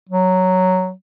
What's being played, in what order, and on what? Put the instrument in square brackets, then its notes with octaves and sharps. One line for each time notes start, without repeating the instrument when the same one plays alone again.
[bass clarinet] F#3